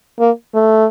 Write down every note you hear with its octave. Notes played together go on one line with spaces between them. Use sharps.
A#3
A3